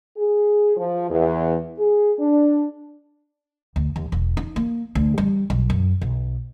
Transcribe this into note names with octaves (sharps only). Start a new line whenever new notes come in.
G#4
F3
E2
G#4
D4
D2
D#2
E1
D#4
A#3
D2
G3
B1
F#2
B1